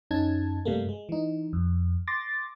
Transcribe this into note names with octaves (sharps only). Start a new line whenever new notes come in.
F#2 C#4 D#4 A5 G#6
G2 C3 G3 A3 A#3
G#3
E3 D#4
F2
C6 D6 A6 A#6